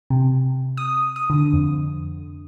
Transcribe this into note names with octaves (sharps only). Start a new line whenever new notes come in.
C3
D#6
D#6
D3
F2